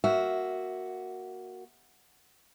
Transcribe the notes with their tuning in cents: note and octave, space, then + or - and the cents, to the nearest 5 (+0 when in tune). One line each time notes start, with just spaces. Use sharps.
A#3 +0 F#4 +0 E5 -10